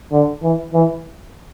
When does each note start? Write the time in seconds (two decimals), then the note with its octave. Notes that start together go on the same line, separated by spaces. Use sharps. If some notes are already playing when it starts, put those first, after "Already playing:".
0.12 D3
0.43 E3
0.74 E3